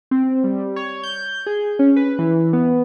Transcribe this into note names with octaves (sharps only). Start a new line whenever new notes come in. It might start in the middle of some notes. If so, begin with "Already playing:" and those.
C4
G3
C#5
G6
G#4
C#4
B4
E3
B3